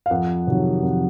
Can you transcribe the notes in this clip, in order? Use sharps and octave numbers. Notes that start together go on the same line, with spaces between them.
F5
F2 F#5
C3 D#3 F#3
F2